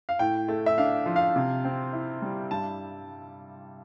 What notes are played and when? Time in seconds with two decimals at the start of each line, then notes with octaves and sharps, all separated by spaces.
0.09 F5
0.19 A2 G5
0.48 A3
0.66 E5
0.78 D4 F5
1.06 F3
1.16 F5
1.36 C3
1.65 C4
1.93 E4
2.22 G3
2.51 G2 A5